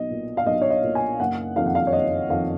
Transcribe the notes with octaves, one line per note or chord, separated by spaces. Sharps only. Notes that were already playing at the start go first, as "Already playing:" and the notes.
Already playing: B1 D#5
A#2
F5
B1 D#5
C#5
D#5
A#2
G#5
F#1 F#5
F2 D#3 F5
F#5
F5
C#5
F#1 D#5
F2 D#3 F5